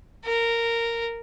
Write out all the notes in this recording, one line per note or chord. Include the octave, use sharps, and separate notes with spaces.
A#4